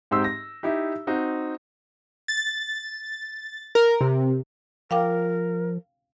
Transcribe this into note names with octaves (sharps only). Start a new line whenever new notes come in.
G#2 C4 D#4 G4 C6 E6
A#6
D#4 E4 G4
C4 D#4 F#4
A6
A#4
C3
F3 A#4 F5 G5 D6